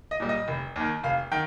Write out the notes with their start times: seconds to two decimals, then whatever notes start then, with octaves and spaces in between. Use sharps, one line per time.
0.11 D#5
0.20 A#2 G3
0.29 D#5
0.48 F1
0.76 D#2 D#3
1.04 F1 F5
1.32 D#3 G5